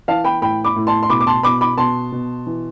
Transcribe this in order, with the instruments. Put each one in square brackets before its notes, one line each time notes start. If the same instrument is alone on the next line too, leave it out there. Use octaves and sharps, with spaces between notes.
[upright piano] E3 F5 A5
G5 B5
A2 G5 B5
B5 D6
A2
A5 C6
C6
B2 B5 D6
D6
A5 C6
B2 B5 D6
B5 D6
B2 A5 C6
B2
E3